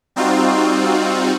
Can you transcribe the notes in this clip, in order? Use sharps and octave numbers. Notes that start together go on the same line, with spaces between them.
G3 C4 D#4 F4 F#4